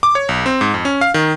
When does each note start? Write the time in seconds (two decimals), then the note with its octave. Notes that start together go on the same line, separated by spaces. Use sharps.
0.03 D6
0.15 C#5
0.29 B1
0.46 C4
0.61 G#2
0.74 F2
0.85 C#4
1.01 F5
1.14 D#3